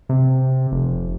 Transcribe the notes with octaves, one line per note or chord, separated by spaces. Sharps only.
C3
F1